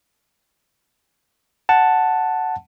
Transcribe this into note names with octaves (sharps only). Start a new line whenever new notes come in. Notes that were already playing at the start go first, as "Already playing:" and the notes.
F#5 A5